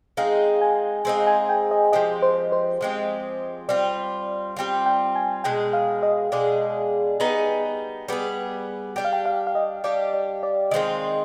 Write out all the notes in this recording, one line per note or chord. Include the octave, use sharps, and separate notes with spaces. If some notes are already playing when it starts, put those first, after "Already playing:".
G#3 C4 D#4 G#4 F5
G#5
G#3 C4 D#4 G#4
G#5
G5
D#5
F3 G#3 C4 G4 D#5
C5
C5
F3 G#3 C4 G4
G3 C4 F4 D5
G3 C4 F4
G5
G#5
B2 G#3 D4 G#4 G5
F5
D#5
B2 G#3 D4 G#4 D5
G3 B3 D#4 G#4
G3 B3 D#4 G#4
G3 D4 G4 G5
F5
G5
F5
F5
D#5
G3 D4 G4 D5
D5
D5
D#3 G#3 C4 F4 D#5